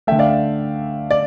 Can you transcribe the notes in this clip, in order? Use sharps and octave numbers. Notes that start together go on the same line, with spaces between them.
D3 A3 E5 G5
D5 F5
D5